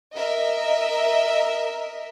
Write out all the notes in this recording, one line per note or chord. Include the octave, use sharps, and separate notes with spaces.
A#4 D#5 E5